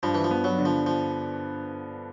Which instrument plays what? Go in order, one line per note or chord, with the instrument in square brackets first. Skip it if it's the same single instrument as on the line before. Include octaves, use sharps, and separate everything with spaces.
[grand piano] G2 [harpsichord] F3
[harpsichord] E3
F3
[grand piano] B3
[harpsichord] F#3
[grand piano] D3
[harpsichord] F3
F3